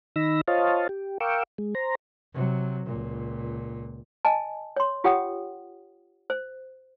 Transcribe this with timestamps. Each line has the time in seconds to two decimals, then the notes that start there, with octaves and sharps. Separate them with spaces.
0.16 D#3 D#4 B5 E6 A#6
0.48 F4 C5 C#5 D#5 F5 A5
0.89 G4
1.20 A#4 F5 G5 C#6 D6 E6
1.58 G#3
1.75 C5 A#5
2.33 C3 F#3
2.86 C#2 A#2
4.25 D#5 G#5 A5
4.76 C#5 C6
5.04 F4 G4 C#5 F#5 G5 D#6
6.30 C5